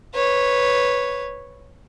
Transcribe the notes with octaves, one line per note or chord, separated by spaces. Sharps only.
B4 C#5